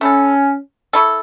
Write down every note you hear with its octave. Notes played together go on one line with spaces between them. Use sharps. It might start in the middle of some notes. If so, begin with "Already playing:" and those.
A3 C#4 E4 A4
A3 E4 A4